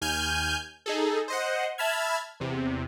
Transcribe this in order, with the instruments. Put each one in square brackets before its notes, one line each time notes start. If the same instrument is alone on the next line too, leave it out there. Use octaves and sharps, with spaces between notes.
[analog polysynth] D#2 G#5 F6 G6
D#4 G#4 A4
C5 D#5 F#5
E5 A5 B5 F6 G#6
E2 C3